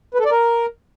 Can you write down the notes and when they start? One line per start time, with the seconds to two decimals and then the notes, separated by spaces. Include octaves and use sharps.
0.14 B4
0.20 A4
0.26 D5
0.31 A#4